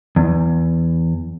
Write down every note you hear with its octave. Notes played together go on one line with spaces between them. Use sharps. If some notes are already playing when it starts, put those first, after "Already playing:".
E2